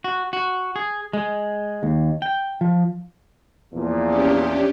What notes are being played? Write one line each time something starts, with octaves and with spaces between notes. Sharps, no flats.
F#4
F#4
G#4
G#3
D#2
G5
F3
E2 A#2 F3
C#4 D4 G4